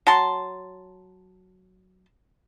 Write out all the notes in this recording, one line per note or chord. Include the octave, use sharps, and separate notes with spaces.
F#3 A5 C6